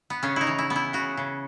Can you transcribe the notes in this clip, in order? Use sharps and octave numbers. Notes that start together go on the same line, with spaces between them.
B3
C#3 C#4
D#4 E4
E3
E4
B3
E4
C#3 F#4
C#3